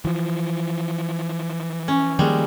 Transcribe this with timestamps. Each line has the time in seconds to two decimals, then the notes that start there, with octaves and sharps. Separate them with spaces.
0.05 E3 F3
1.88 C#4
2.19 D#3 F3 G3 G#3 A#3